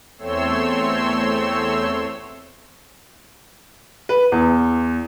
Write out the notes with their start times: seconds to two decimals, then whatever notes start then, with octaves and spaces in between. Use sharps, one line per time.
0.19 E2 A3 C4 C#5 C6 E6
4.09 B4
4.32 E2